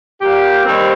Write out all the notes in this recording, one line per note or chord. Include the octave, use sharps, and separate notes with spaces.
A#2 G3 A#3 G4
D#2 D#3 G3 C4